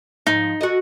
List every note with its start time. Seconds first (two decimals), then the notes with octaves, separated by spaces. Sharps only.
0.27 G#2 F3 D#4
0.61 F#4 A4 D#5